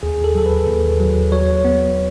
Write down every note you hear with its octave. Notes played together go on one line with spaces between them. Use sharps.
D#2 G#4
A4
F#3 A4
B4
D#2
F#3
F#3 C#5
B3